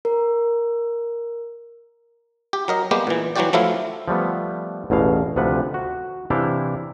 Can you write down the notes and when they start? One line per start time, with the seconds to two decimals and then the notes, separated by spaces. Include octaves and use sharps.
0.05 A#4
2.53 G4
2.68 F#3 A#4 D#5
2.91 G3 G#3 A#3 B3 G4
3.07 A#2 E3
3.36 E3 F#3 G3 F#4 G4 D5
3.53 F3 F#3 A3 E4 F4
4.08 F3 G3 A3 B3
4.90 A1 E2 B2 F5
5.36 D2 C3 F3 B4 F#5
5.74 F#4
6.30 C3 E3 D4 E4 F5 G5